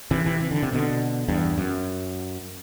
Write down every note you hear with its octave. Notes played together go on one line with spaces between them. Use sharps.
C3 E3
C3 E3
E3
D3
C3
B2 D3
E2 G2
F#2